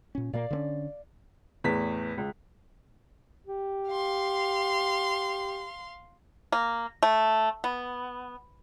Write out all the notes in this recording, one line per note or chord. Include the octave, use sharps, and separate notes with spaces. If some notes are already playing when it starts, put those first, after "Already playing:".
A#2 C#4
A#2 A#3 D5 F5
D3 B3 C#4
E2 A2 B4 B6
C#2
G4
F5 C6
A#3
A3
B3